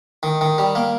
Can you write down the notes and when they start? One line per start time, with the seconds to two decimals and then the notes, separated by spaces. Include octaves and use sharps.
0.23 D#3
0.41 D#3
0.58 G3
0.75 A#3